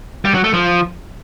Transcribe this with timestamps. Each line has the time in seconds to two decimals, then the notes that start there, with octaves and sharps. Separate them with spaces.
0.25 G3
0.34 F#3
0.44 A3
0.54 F3